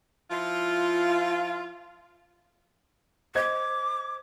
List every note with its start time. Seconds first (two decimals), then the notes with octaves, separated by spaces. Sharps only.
0.31 F3 E4 F4
3.35 C5 D#5 D6 G#6